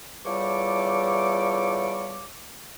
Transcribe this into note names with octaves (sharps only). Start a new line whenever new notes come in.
E2 A2 F3 G3 C#6 D6